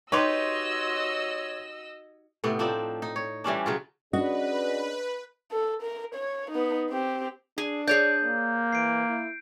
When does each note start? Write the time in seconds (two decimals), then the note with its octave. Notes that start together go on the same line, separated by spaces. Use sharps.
0.12 D#4 F#4 G4 B4 C#5 D#5 C6 E6
2.44 A2 C3 B3
2.59 F3 C4 D4 D#4
3.02 D#4
3.16 C#5
3.44 E3 G3 C#4 D4
3.66 C#3 F#3 F4
4.13 C#4 D4 F#4 G#4 B4 D5 D#5
5.52 A4
5.82 A#4
6.15 C#5
6.52 B3 D#4
6.90 C4 G4
7.58 D4 G#4
7.88 G#4 C#5 D5 G6
8.24 A#3
8.73 E3 C7 D7
9.09 E4